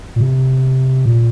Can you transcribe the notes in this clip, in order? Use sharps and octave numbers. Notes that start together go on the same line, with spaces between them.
A#2
C3
A#2